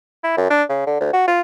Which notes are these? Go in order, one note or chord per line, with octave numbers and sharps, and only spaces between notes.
E4
F#2
D4
C#3
D3
D2
F#4
F4